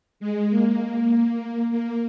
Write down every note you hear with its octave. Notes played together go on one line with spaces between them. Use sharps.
G#3
A#3
A#3